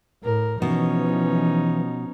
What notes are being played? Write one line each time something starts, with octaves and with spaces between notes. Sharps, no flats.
A2 A#4
B2 E3 F3 C#4 D#4